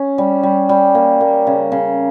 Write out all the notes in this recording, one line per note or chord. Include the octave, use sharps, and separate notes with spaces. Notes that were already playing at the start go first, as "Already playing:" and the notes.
Already playing: C#4
G3
G3
G3
A#3
A#3
C#3
C#3